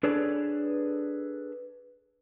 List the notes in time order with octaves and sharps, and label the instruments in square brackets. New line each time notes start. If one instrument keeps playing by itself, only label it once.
[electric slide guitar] D4 G#4 A4 B4 C#5 D5